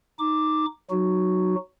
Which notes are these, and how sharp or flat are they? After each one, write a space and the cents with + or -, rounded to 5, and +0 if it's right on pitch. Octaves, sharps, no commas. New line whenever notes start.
D#4 +0 D6 +0
F#3 +0 D#4 -10 F#4 +0